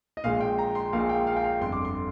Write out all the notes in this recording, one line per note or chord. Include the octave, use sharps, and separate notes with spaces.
D#5
A#1 A#2 G#3 F5
G5
A#5
C6
A#1 A#2 G#3 F5
G5
F5
G5
F5
G1 F2 D3 C6
D6
C6